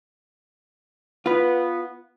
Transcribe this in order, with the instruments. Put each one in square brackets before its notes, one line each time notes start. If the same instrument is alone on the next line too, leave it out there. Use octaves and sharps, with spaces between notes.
[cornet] B3 [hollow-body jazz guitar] F4 B4